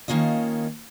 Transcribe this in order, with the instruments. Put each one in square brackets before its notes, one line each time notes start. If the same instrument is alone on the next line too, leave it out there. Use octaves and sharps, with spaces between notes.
[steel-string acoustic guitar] D#3 A#3 C#4 F4 D#5